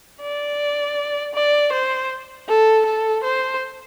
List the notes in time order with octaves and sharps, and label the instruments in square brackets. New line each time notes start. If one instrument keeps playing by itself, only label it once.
[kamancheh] D5
D5
C5
A4
A4
C5